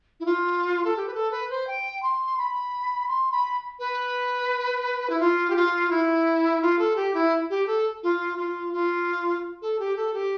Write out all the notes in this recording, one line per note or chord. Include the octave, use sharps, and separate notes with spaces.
E4
F4
A4
G4
B4
A4
B4
C5
G5
C6
B5
C6
B5
B4
E4
F4
G4
F4
E4
F4
A4
G4
E4
G4
A4
F4
F4
F4
A4
G4
A4
G4